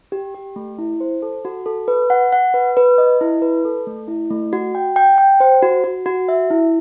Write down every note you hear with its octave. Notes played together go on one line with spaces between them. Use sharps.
G4
G4
A3
E4
C5
A4
F#4
A4
B4
F#5
F#5
B4
B4
D#5
E4
B4
A4
A3
E4
A3
F#4
G5
G5
G5
C5
F#4
F#4
F#4
E5
E4